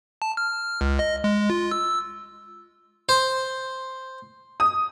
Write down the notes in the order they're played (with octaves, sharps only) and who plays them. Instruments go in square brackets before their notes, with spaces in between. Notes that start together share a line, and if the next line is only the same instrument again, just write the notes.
[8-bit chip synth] A5
F6
C#2
D#5
G#3
F4
E6
[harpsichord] C5
[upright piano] D#6